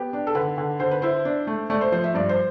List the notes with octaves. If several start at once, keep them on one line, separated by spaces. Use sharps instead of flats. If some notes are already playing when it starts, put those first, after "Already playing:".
Already playing: B3 G4
D4
A4
D3 B4
D3
D3 C5
B4
E4 C5
D4
A3
A3 D5
C5
F3 C5
E5
G2 D5
C5